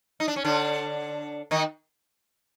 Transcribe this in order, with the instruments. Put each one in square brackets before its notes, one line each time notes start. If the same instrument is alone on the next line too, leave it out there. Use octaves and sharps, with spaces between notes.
[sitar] D#4
D4
C#4
D3 D4
D#3 D#4